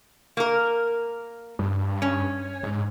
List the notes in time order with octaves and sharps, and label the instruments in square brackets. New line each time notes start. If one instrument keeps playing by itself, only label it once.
[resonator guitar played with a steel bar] A#3 A#4
[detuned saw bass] G2
[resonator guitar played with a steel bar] C#4
[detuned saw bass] G#2